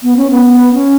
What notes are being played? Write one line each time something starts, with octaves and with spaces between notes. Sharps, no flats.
B3
C#4
B3
C#4